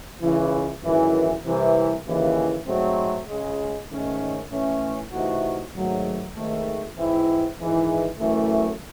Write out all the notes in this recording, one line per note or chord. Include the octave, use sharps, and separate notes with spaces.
C#2 C#3 E3
G#1 F#2 E3
C2 C3 E3
D#2 C#3 E3
G#2 F#3 A3 C4
C#2 C#3 G#3
G#2 D#3 A3 C#4
A2 E3 A3 C#4
C3 E3 A3 D#4 F#4
G#1 G#2 F#3 A3
G#1 G#2 D#3 A3
G#2 E3 C4 E4
G#1 G#2 E3 G#3 D#4
F#2 E3 A3